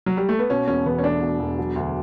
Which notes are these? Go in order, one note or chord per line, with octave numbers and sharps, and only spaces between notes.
F#3
G3
A3
B3
B2 C#4
E1 C#4
E2 B3
C#4
A3 D4
B2
E1
F#3
D2